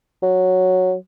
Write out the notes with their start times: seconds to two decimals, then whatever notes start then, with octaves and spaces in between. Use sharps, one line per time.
0.22 F#3